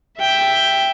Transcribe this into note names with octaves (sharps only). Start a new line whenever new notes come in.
E5 G5